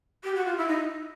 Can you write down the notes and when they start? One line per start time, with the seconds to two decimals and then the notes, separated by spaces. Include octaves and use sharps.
0.23 G4
0.35 F#4
0.45 F4
0.57 E4
0.68 D#4